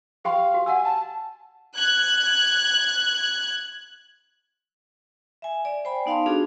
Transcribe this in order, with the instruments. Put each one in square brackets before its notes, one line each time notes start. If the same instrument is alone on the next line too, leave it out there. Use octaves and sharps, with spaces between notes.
[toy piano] G4 G5 C6 [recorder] F5
[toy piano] F#4
[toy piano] F#5 E6 [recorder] G#5
[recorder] A5
[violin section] F#6 G#6
[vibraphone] E5 G#5
D5
C5 G5 G#5 B5
B3 D#4 F5 A5 C6
D4 F4 F#4 G#4 A4